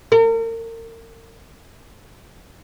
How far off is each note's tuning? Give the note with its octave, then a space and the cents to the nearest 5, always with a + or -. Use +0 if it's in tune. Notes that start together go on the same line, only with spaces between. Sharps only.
A#4 -35